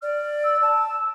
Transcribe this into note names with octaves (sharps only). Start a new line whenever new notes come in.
D5 F6
E6
A5